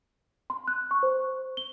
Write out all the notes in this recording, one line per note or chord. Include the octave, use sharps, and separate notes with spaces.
C6
F#6
C#6
C5
G7